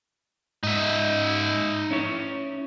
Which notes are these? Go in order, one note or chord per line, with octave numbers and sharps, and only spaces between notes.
G#2 D#4 E5
C#4 E4 C#5